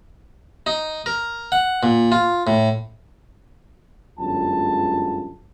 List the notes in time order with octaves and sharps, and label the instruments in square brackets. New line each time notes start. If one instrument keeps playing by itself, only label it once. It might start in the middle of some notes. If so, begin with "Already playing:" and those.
[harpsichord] D#4
A#4
F#5
A#2
F4
A2
[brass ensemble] G1 F#2 F#3 G#3 F4 A5